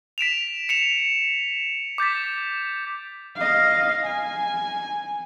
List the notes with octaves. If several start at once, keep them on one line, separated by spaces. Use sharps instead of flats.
B6 D7 E7 F7
C#7 E7 F7
D6 G6 A6 B6
D#5 F5
G#5